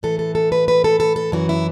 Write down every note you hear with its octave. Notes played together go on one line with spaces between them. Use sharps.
A2 E3 A4
A4
A4
B4
B4
A4
A4
A4
F#2 E3 F#4
E4